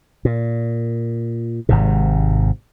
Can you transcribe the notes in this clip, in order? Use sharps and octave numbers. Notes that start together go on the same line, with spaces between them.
A#2
G#1 G#2 C3